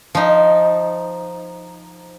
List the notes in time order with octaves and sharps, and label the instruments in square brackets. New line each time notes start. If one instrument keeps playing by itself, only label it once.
[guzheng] F3 D#4